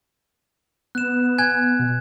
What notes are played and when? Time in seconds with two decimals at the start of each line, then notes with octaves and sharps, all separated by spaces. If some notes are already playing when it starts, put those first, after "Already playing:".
0.95 B3 F#6 E7
1.39 G#5 F#6 G#6
1.79 B2